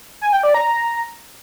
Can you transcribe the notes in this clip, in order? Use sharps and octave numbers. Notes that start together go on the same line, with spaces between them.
G#5
G5
D5
A#5